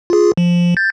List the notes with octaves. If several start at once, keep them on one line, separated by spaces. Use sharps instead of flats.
F4 G#4
F3
G6 A6